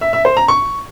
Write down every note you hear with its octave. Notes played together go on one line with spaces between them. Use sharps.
E5
E5
C5
A#5
C#6